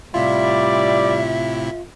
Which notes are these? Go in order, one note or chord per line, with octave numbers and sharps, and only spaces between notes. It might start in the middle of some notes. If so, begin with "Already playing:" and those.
A2 C3 G3 E4 F4 D5 E5